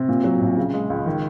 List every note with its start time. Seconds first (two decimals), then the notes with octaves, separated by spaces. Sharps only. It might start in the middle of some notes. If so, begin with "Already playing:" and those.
Already playing: C3
0.09 A#2
0.24 F#3
0.41 A#1
0.57 C#3
0.74 G#3
0.90 C#2
1.06 D#3